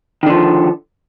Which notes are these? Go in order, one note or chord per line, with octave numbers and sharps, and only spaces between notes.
D3 D#3 F3